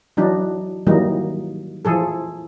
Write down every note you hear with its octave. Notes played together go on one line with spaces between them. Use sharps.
E3 F#3 D4 D#4
D#3 E3 F#3 G3 A#3 D#4
E3 F3 G#4 A4